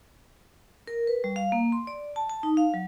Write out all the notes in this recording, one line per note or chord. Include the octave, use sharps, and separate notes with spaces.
A#4
B4
G3
F5
A#3
C6
D5
A5
A5
D#4
F5
F#3